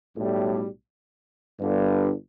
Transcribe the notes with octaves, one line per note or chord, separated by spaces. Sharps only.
B1 A2 G3
G1 G2 D3